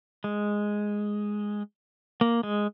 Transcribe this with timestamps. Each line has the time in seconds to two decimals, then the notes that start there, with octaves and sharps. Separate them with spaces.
0.24 G#3
2.21 A#3
2.43 G#3